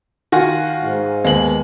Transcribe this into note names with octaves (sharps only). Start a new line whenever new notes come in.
D#3 F4 F#4 F5 G#5 A#6
G#2
D#2 G#3 B3 F#7